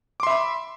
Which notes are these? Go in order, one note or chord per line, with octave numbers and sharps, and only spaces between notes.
E5 B5 C6 D6